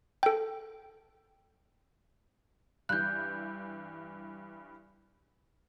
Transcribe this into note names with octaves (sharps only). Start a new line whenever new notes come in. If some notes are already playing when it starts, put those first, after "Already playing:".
A4 G5
G2 E3 F#6 G6